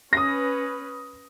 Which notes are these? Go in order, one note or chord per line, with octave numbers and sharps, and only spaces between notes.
C#4 B4 D#6 A#6